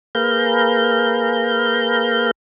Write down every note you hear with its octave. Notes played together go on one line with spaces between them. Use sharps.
A#3 G#4 B4 F5 A#5 G6